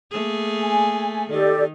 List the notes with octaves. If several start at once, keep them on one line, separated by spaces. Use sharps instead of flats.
A3 A#3 G#4
G#5
D#3 G4 A4 D5